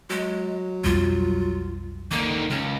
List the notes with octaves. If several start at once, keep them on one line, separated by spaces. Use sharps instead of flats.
F#3 G#3
B1 F2 G3 F4
G#2 D3 D#3 A#3
C#2 C#4